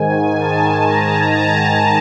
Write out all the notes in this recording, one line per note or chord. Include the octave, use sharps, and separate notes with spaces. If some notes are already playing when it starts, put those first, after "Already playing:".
Already playing: G#2 D#3 G#5
A5
A#5
A5